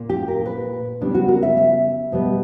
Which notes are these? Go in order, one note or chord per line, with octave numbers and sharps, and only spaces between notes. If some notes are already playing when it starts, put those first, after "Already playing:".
Already playing: A#2 A#3
G4
A#4
B4
C#3 G3 B3 D4
F#4
A#4
E5
E5
B2 G3 B3